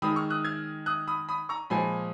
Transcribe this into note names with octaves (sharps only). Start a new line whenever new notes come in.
D#3 G#3 B5 D#6
C#6 F6
D#6 F#6
F6 G#6
D#6 F#6
B5 D#6
B5 D#6
A#5 C#6
A#2 F3 G#3 G#5 B5